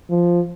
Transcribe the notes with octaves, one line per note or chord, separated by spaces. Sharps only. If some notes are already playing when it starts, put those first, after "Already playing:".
F3